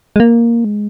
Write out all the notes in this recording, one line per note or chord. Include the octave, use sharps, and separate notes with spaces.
G#3
A#3
G#3